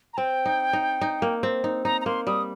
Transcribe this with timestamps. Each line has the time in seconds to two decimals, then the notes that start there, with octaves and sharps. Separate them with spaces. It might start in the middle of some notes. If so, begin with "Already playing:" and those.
0.14 A#5
0.17 C4 G5
0.46 D#4
0.73 D#4
1.01 D#4
1.22 A#3
1.43 C4
1.64 D#4
1.85 D#4 A#5
2.01 A#5
2.06 A#3 C6
2.27 G3 D#6